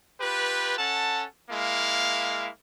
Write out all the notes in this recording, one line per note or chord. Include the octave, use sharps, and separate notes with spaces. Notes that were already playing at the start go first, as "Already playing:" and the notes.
F4 G4 B4
C#4 A4 F#5 A5
G#3 A#3 E4 F5